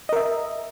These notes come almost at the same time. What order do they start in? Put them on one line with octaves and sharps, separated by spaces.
D#5 A#4 E5